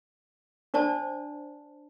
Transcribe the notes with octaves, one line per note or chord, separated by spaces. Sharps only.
D4 C5 D5 A5